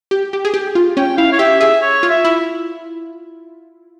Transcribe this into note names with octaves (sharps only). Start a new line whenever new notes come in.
G4
G4
G#4
G4
F4
C#4 G5
E4 F5
C#5
G4 E5
G#4 E5
C#5
F4
E5
E4